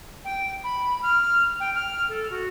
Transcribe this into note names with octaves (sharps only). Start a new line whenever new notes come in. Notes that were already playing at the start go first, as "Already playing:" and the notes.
G5
B5
F6
G5
F6
A4
F#4